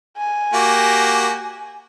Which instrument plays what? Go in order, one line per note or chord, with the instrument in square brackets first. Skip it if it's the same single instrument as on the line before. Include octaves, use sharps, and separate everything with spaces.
[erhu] G#5
[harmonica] A#3 F#4 G4